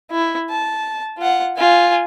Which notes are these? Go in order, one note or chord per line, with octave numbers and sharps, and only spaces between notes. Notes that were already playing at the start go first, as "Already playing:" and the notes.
E4
A5
F4 F#5
F4 G#5